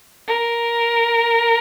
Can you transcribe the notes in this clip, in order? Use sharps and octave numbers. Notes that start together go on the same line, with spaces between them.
A#4